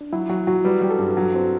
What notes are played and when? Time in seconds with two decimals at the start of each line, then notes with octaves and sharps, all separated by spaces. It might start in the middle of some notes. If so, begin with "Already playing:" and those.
0.01 D4
0.13 F#3 E4
0.29 F#3 F#4
0.47 F#3 F#4
0.64 G3 B4
0.82 G3 G4
0.91 A4
0.99 G2
1.17 F#3
1.34 C4